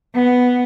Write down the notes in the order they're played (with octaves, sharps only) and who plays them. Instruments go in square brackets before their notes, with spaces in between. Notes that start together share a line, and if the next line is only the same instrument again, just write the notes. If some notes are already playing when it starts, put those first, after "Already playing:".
[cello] B3